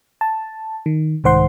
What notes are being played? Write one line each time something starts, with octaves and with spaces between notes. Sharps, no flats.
A5
D#3
C2 G#2 D#3 C5 F#5 C6